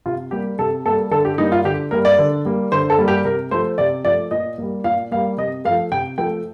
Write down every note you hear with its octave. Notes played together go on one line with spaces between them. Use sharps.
C3 F4
G3 A#3 G4
C3 A4
G3 A#3 A4
D3 A4
G4
G3 A#3 D#4
F4
D3 G4
G3 A#3 A#4
D5
D3
G3 A#3
D3 C5
A4
G3 A#3
G4
C3 A#4
F3 A3 C5
C3 D5
F3 A3 D5
A#2 D#5
G3 A#3
A#2 F5
G3 A#3 F5
C3 D#5
F3 A3 F5
C3 G5
F3 A3 G5